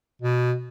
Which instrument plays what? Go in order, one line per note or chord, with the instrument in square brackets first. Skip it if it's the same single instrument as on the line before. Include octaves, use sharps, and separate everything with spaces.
[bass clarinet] B2